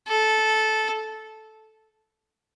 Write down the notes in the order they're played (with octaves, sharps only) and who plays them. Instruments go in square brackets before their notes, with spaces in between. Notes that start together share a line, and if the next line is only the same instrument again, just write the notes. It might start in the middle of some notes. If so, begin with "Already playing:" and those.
[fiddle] A4